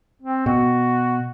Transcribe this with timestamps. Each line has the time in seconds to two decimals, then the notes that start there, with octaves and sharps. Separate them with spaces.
0.22 C4
0.46 B2 F#4